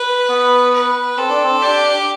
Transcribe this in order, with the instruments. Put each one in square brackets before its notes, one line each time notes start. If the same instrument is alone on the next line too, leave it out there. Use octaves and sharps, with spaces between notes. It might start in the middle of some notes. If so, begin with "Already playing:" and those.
Already playing: [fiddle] B4
[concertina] B3
[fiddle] B4
[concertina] C4 [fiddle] A4
[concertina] D4
C4
[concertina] D4 [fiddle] G4